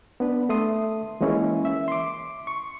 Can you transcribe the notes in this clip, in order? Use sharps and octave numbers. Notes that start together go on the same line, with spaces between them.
B3 D4 B4
A3 A4 E5 C6 D#6
E3 G#3 A#3 C#4 E4
E5
C6 D6
C#6